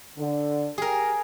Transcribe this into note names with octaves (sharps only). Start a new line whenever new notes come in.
D3
G4 G#4 A#4